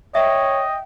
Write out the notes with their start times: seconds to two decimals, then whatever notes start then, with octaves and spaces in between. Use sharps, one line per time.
0.15 C#5 D#5 E5 G5